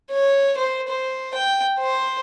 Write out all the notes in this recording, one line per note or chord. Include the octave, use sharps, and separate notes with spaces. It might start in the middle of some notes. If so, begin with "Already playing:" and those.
C#5
C5
C5
G5
C5